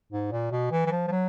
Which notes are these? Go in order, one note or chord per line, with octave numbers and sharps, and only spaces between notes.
G#2
A#2
B2
E3
E3
F3
F3
F#3